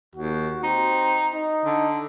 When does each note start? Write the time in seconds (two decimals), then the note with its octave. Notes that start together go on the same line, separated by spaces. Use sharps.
0.16 D#2 F#4
0.64 C4 D#4
1.33 D#4
1.65 D3